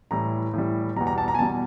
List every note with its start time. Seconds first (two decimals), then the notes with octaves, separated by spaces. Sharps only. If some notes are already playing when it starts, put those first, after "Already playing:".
0.11 A2 E3 G3 A#5
0.53 A2 E3 G3
0.96 E2 B2 G3 A#5
1.07 A#5
1.18 A5
1.28 A#5
1.35 G#5
1.39 E2 B2 G3 A5